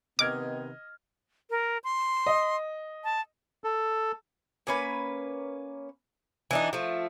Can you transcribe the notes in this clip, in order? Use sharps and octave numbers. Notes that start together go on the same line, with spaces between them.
C3 D#3 B3 D#5 D6 F6 G#6
A#4
C6
D#5
A5
A4
A#3 C#4 B4
E3 D4 D#4
F3 A3